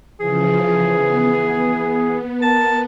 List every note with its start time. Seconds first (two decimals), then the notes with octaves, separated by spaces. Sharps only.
0.20 C#3 E3 F3 G#4
0.89 B3
2.40 A#4 A5